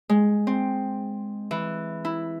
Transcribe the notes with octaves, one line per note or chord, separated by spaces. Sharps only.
G#3
C4
E3
E4